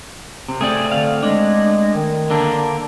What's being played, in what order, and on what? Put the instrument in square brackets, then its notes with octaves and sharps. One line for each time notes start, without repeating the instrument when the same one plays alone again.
[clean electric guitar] C3
[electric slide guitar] A3 C4 D5 [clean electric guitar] G#4
[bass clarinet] D3 [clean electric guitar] F5
[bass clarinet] G#3 [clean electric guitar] D4
[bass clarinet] D#3
[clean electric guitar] D3 A#3 D4